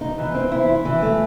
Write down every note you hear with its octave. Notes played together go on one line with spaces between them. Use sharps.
D#4
E3
C4
E4
E4
E3
A3